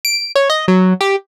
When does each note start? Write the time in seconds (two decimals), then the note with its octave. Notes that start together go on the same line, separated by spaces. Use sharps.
0.05 D7
0.35 C#5
0.50 D#5
0.68 F#3
1.01 G4